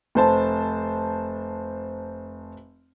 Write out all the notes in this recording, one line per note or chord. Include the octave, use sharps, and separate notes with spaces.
F1 C5 A5